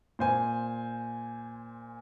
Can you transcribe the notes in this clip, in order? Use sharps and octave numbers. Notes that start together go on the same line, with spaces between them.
A#2 C5 G#5